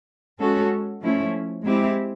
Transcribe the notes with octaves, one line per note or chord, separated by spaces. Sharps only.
G#3 C#4 F#4 A4
F3 A3 C#4 E4
G#3 C4 E4 G4